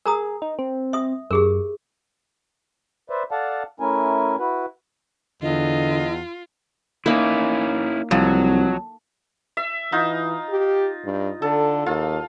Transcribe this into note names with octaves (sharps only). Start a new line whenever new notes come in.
G#4 A#4 A#5 D#6
D#4
C4
E5 D#6
F#2 G4 G#4 A#4
B4 C5 D5 E5
A4 D5 F5 F#5 A5
A3 C#4 E4 A#4 G#5
E4 F#4 B4
E2 D3 F4 D#5
A#3 C#4 D#4 E4
C2 F2 F#3
E5
E3 D#4 F4
G4
G2
D3 A4
D#2 F4